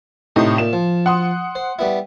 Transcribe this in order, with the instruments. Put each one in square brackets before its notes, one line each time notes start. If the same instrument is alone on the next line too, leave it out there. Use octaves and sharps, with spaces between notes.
[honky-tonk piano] A2 C3 D#4 [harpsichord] D#5 C6
[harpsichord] A#2 [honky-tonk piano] E7
[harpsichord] F3
[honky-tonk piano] F#5 C6 D#6
[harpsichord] C5
G3 B3 E4